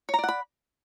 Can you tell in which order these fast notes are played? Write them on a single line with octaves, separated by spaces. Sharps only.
C#5 A#5 D5 F#5 B5